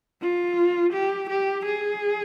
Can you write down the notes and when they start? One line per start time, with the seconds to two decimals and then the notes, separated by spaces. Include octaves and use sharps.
0.21 F4
0.93 G4
1.30 G4
1.65 G#4